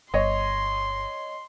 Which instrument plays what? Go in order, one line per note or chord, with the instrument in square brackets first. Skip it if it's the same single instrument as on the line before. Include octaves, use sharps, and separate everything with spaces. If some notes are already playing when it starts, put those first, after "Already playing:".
[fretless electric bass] G1 [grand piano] C#5 D#5 [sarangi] C6